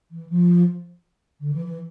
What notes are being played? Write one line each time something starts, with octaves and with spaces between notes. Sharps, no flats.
E3
F3
D3
E3
E3